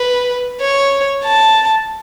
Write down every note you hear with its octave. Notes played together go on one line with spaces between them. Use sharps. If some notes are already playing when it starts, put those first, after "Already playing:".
Already playing: B4
C#5
A5